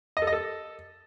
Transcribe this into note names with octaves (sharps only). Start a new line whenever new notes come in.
D#5
A4
D#5
A4